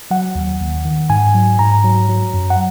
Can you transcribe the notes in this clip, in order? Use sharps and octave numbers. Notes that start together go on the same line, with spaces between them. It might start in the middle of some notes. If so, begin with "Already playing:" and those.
F#3 F#5
D#2
D#2
D#3
G#2 G#5
F#3
G#2 A#5
F#3
F#3
F#2
F#5